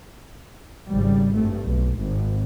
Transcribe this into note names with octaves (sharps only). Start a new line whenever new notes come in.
G#1 C#3 G3
G2 A3
B1
G#1